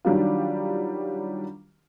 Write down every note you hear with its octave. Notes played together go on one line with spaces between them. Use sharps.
D#3 F#3 G3 D4 F4